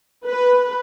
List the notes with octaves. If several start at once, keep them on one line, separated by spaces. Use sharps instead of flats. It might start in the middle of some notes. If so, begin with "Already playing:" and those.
B4